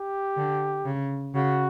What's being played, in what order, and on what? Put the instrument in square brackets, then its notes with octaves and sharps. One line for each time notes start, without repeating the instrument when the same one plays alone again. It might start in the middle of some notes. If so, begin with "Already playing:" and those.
Already playing: [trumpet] G4
[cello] D3
C#3
[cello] C#3 [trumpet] F#4